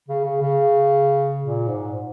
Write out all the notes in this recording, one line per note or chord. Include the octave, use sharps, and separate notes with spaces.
C#3
C#3
C#3
A#2
G#2